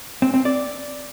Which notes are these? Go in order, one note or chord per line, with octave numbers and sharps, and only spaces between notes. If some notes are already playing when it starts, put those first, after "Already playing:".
C4
C4
D5